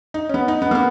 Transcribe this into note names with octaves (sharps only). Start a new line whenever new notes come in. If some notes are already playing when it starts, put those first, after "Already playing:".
D#4
C#4
B3
D#4
B3
A#3
B3